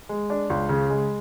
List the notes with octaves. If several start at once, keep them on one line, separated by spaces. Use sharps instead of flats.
G#3
D4
C#2
C#3
G#3